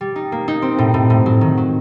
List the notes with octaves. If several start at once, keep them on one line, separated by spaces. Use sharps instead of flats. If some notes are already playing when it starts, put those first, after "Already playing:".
G3
D#4
A#3
D#4
C4
A2
A2
A2
F#3
D#3
F#3